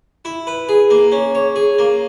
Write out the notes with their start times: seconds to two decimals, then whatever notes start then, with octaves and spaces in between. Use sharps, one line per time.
0.25 E4
0.47 B4
0.69 G#4
0.90 A#3
1.12 C#4
1.35 C#5
1.56 G#4
1.78 A#3